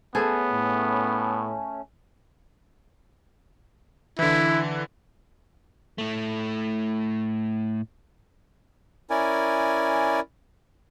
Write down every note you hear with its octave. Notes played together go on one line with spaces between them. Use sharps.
A3 B3 C#4 G#4 A4 C5
A2
D3 E3 E4
A2 A3
C#4 E4 A#4 D5 G#5